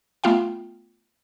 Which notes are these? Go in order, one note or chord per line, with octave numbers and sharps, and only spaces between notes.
A3 B3 F4 F5 G5